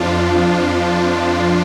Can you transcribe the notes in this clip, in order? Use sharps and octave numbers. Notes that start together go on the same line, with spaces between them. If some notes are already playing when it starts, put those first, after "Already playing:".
Already playing: F2 F3 D4 F4